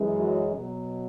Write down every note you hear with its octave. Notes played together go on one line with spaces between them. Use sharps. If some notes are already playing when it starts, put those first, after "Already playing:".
Already playing: F#2 E3 G#3
F#3 F#4
B2 F#3